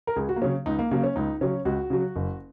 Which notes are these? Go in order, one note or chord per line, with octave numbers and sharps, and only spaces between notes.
A#4
C#2 G#4
F#4
A#3
C#3 F#3 C#4
C#2 D#4
A#3
C#3 F#3 A#3
C#4
C#2 D#4
C#3 F#3 C#4
C#2 F#4
C#3 F#3
F#1